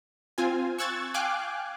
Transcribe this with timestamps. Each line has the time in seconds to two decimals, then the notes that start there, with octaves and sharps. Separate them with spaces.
0.38 C4 F4 G#5
0.78 C#6 E6 F#6 G#6 A6
1.14 F5 G5 G#5 D6 F#6